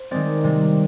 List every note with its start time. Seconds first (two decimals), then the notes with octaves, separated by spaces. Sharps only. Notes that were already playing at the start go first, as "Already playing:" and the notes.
Already playing: C5
0.11 D#3 G#3 C4 D5
0.44 C3 G3 A#3